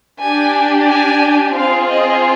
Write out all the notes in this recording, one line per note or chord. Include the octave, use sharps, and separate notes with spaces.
D4 G4 G#5
G#5
C4 F4 G#4 F5
D#5